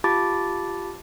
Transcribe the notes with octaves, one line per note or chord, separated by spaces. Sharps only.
F4 G4 A5 B5 D6 A6